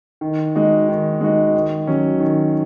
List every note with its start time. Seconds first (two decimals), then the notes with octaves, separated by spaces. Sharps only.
0.21 D#3
0.55 G#3 D#4 F#4
0.89 D#3
1.21 G#3 D#4 F#4
1.54 D#3
1.87 F#3 C#4
2.20 D#3